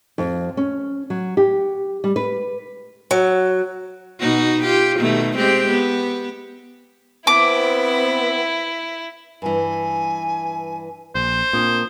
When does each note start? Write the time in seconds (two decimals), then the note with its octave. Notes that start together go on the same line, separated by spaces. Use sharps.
0.18 F2
0.57 C#4
1.10 F#3
1.37 G4
2.04 G3
2.16 B4
3.11 F#3
4.20 B2 D#4 F#4
4.64 F4 G4
4.98 B2 D#3 A3
5.36 G#3 C4 G4
5.70 B3
7.27 B3 C4 E4 D6
9.42 G2 E3 G#5
11.15 A#1 C5
11.53 A#2 C4 D4 A#4 D#6